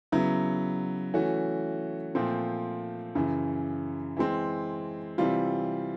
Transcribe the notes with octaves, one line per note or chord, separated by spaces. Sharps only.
C#3 F#3 B3 E4
E3 A3 C#4 F#4
A#2 F3 A3 C4
F#2 C#3 E3
E3 G#3 C4
C3 E3 G3 C4 F4